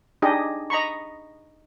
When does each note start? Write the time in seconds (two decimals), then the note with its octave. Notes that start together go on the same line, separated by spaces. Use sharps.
0.22 D4 D#4 G4 G#4 D#5
0.70 D#5 A#5 B5 C#6